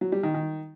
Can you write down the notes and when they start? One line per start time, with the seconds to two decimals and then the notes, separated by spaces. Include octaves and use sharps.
0.01 F#3
0.12 G3
0.23 D#3
0.34 D#3